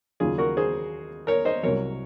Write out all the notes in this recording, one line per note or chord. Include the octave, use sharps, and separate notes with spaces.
D#2 C#3 F#3 F4 G#4
F#4 A#4
G#4 C5
A#4 C#5
C5 D#5
C2 C3 F#3 A#4 C#5